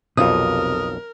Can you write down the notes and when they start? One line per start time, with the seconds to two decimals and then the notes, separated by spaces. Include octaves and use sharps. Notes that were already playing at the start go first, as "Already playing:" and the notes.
0.17 B1 F2 C3 F4 A#4 D#6